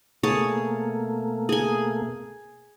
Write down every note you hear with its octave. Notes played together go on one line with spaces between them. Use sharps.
B2 A3 A#3 G#4 C#5 A5
G#4 G#5